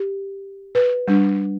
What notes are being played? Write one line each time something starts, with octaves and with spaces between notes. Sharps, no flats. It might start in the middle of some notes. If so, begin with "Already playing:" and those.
Already playing: G4
B4
G3 D4